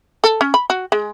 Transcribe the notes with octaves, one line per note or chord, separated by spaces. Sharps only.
A4
C#4
B5
F#4
G#3